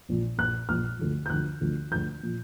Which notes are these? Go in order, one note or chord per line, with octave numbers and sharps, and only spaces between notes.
A#1 A#2 F3
A#1 A#2 F3 F#6
A#1 A#2 F3 F6
D2 D3 F3
G6
D2 D3 F3 F#6
D2 D3 F3
D2 D3 F3 G6
A#2 F3